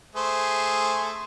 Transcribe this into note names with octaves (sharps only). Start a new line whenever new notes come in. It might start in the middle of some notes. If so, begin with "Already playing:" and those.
A3 G#4 C5